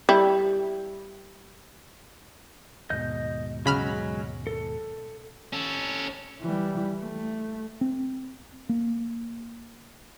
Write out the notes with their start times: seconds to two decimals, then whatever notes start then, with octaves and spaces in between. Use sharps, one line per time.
0.09 G3 E4
2.90 D#2 G#2 B2 D#5 G6
3.66 C#3 F#3 G#3 B5 F6
4.47 A4
5.53 C#4 A4
6.41 E3 G3
7.01 A3
7.81 C4
8.69 A#3